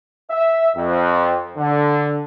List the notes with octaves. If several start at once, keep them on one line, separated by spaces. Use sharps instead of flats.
E5
F2
D3